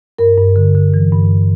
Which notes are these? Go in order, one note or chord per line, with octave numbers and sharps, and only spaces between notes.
G2 A#4
G2
D3
D3
E3
G2